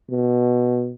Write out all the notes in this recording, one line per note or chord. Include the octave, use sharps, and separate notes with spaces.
B2